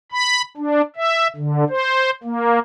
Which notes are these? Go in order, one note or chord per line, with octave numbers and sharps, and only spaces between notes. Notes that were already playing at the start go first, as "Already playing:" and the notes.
B5
D4
E5
D3
C5
A#3